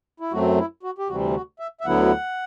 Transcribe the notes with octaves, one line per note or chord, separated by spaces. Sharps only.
E4
F#2 F#3 A3 C4 F#4
E4
F#4
G4
D2 C3 E3 G3 C4 F#4
F#4
E5
E5
D2 D3 F#3 B3 E4 F#5